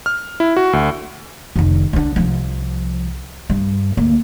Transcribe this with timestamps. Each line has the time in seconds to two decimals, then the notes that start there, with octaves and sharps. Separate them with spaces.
0.06 F6
0.40 E4
0.57 F#4
0.73 D2
1.56 F1 D#3
1.93 G2 D3
2.16 C2 F3
3.50 G2
3.97 D2 A#3